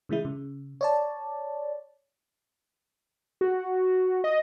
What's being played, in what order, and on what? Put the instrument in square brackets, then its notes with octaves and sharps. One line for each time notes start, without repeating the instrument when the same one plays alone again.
[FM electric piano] C#3 E3 G#3 E4
C#3
C#5 D5 A5
[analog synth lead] F#4
D#5